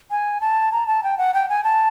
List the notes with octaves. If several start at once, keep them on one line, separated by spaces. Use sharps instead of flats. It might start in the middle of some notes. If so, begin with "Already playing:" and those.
G#5
A5
A#5
A5
G5
F#5
G5
G#5
A5